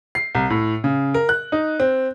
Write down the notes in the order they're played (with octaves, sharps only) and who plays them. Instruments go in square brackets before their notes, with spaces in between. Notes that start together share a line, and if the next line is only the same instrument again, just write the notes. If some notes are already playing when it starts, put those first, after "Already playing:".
[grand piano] C7
C2
A2
C#3
A#4
F#6
D#4
C4